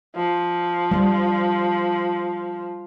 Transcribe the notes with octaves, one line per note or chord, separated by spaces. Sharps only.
F3
G3